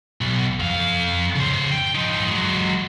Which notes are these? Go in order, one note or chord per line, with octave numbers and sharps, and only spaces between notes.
B1
F2 F5
C#3 C5
G5
F3 D#4
F#3 G#3